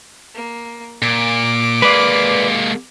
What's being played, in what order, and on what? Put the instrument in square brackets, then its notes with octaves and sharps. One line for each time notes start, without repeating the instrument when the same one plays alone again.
[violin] A#3
[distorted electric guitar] A#2 [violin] D6
[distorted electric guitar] G#3 A#3 [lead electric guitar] B4 D5